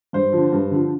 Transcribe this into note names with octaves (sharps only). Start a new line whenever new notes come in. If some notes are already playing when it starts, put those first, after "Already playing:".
G2 C5
D3 F3
G2
D3 F3